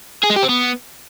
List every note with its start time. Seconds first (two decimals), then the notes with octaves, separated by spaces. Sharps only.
0.23 G#4
0.30 G#3
0.36 G4
0.43 C4
0.49 B3